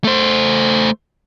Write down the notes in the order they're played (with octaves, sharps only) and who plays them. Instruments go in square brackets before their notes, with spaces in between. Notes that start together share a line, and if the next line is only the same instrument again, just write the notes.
[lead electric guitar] A3 C5